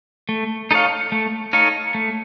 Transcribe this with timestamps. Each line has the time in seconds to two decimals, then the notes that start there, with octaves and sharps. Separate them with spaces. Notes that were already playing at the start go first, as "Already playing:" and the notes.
0.29 A3
0.71 D#4 A4 C#5 F5
1.12 A3
1.53 D#4 A4 C#5 F5
1.94 A3